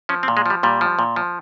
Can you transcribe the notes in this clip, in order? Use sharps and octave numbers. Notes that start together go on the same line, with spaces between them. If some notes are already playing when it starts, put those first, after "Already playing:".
F3 C#4
C4
A#2
G#3
F3 G3
A#2 G3
F3
A#2
F3